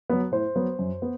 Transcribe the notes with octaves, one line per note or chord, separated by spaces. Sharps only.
F#3 B3
A2 C5
F#3 B3
F#2
B3